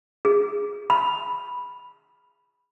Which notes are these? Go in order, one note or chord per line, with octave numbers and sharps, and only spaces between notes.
G#4
B5